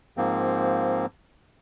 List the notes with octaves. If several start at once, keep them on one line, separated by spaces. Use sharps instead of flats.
G#2 F3 A#3 C4